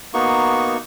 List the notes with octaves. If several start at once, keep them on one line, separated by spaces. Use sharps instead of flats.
A#3 B3 D#4 F#4 C#6